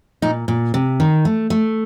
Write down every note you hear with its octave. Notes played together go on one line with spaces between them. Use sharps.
A#2 D#4
A#2
C3
D#3
A3
A3